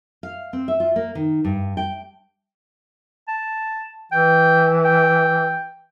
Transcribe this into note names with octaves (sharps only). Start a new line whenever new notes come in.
F5
C4
E5
F4
A#3
D#3
G2
G5
A5
E3 G5
G5